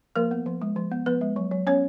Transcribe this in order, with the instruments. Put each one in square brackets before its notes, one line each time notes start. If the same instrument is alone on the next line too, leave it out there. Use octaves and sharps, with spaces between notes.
[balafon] F3 A#3 A#4
B3
F3
G#3
F3
B3
F3 B3 B4
G#3
F#3
F#3
B3 C#4 C#5